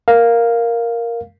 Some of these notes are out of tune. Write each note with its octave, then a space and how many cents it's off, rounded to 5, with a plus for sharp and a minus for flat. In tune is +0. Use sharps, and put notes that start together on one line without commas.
A#4 +0 F5 +0